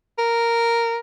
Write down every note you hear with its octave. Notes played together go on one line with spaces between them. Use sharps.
A#4